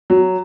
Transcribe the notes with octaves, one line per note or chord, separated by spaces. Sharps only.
F#3